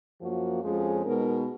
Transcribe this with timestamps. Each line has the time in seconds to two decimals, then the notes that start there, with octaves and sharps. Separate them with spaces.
0.20 F#2 F3 A#3 C#4 F#4
0.62 F2 F3 G#3 C#4 G#4
1.04 B2 G#3 B3 D#4 A#4